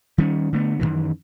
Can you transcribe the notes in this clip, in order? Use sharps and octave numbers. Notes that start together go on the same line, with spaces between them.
D#3 G3 C#4
D3 A3 B3
F#2 C3 D#3 E3